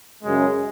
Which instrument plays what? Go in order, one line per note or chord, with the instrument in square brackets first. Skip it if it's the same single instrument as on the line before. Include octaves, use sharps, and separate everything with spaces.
[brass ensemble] F#2 C#3 G#3